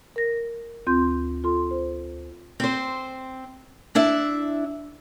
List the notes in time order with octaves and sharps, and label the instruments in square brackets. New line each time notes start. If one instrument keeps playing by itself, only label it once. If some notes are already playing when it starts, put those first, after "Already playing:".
[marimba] A#4 A#6
D2 C4 F4 C6 G6
F4 A4 C6
C5
[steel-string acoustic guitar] C4 C5
D4 E4 E5